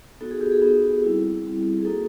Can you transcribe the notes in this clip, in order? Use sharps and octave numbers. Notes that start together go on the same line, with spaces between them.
B3 D#4 F#4 A4
G#4
G4
G#4
B3 D#4 F#4 G#4
G3 C4 E4
G3 C4 E4
G#4
A#3 D#4 F#4 A4